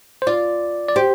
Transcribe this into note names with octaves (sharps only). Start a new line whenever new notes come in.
C5
F4 D5
D5
G4 C5